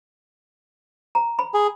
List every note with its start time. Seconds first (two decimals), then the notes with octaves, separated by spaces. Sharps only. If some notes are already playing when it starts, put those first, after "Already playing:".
1.15 A#5
1.39 B5
1.54 G#4